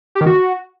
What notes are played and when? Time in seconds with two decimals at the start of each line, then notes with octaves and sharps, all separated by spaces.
0.15 G4
0.21 D#3
0.26 F#4